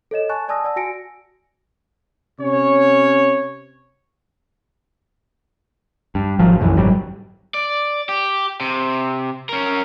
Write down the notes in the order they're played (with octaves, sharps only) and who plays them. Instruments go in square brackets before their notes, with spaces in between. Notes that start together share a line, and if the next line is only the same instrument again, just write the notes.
[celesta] A4 C#5 D#5 E7
G#5 A5 C#6 F#6 A6
D5 G#5 A5 D#6 E6 A#6
D5 F#5 A5 E6
F#4 G#5 A#6 C#7 D7
[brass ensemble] C3 C#4 C#5
[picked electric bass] G2
G#1 F3 F#3
B1 F#2 E3
G#1 F#3 G3
[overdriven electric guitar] D5
G4
C3
C#4 A#4